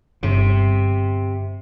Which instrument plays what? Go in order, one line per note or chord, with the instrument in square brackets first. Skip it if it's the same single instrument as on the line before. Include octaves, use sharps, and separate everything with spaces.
[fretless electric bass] G1 [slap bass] C3